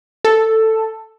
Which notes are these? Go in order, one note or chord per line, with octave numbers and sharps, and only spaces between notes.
A4